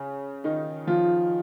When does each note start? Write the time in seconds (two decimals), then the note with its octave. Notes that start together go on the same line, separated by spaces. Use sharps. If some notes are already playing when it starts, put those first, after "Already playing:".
Already playing: C#3 C#4
0.44 D#3 D#4
0.87 F3 F4